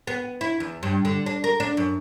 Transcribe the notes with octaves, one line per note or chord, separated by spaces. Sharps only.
B3
E4
E2
G2
D3
D4
A#4
D4
F#2